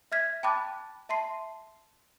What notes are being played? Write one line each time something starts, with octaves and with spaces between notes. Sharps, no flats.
E5 F6 G#6 B6
G5 A5 B5 D6 F#6 A6
E5 A5 C6 C7